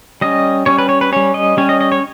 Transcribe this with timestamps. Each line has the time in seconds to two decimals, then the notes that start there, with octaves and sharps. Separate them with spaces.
0.21 G3 C#4 D#5
0.66 G3 C#4 C#5
0.79 B4
0.89 C#5
1.01 B4
1.12 G3 C#4 C#5
1.34 D#5
1.57 G3 C#4 C#5
1.69 D#5
1.81 D#5
1.92 C#5